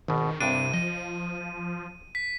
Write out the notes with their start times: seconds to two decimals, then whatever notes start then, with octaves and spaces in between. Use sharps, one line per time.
0.08 G#1 B2 D#3
0.41 C2 G2 C3 D4 D#7
0.74 F3 D#5
2.15 B6